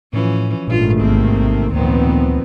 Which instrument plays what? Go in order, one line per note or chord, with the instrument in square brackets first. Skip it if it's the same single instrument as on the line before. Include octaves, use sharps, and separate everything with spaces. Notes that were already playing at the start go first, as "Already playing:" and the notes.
[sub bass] A2 [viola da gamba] E3 F3 C#4
[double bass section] G#1 D#3 A3 [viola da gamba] G2 F4 [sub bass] A#2
[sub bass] A1 [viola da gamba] C3 A#3 C4
[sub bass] D2 [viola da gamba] A#2 D#3 F3 [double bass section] B3 C4